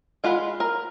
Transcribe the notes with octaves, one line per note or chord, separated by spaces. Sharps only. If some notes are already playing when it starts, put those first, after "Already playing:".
G#3 F4 F5 F#5 B5
A#4